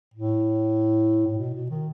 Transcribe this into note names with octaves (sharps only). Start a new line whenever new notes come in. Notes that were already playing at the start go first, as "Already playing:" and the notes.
A2
A2
B2
B2
D#3